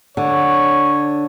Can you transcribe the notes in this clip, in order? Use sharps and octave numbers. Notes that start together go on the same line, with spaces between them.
D3 C#5